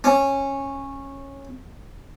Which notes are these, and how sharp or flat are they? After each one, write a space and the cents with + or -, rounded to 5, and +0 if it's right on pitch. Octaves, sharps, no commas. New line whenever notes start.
C#4 -15